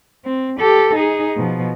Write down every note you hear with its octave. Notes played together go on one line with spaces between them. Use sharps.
C4
G4 A4
D#4 G#4
B2 F3